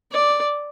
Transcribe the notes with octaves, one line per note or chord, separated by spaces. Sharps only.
D5